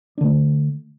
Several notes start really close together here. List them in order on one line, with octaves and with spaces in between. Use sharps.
D4 D3 A3